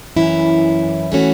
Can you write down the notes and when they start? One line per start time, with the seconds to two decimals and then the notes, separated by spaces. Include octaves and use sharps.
0.17 F#2 E3 C#4 E4
1.12 E3 A3 C#4 F#4